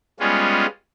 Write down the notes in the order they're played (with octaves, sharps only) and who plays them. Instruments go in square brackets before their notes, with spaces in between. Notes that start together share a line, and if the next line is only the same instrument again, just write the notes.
[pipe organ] G3 G#3 B3 C#4 F4